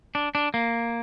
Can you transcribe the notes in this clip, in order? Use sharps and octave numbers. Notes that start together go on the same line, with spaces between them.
D4
D4
A#3